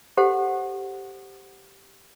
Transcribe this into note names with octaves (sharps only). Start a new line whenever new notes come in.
G4 A4 C5 F#5